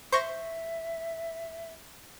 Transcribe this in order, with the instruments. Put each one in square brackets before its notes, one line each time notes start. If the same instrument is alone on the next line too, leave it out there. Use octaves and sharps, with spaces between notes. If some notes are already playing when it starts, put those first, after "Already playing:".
[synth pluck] C5 C#6 A#6 [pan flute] E5